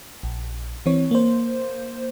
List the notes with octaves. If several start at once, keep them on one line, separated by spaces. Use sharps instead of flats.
A#1
E3 C4 C#5
A#3 C5